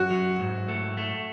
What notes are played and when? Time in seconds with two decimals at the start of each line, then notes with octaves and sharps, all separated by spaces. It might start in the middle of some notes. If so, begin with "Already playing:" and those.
Already playing: F#2 F#4
0.10 F#3
0.40 G#2
0.68 A3
0.97 A3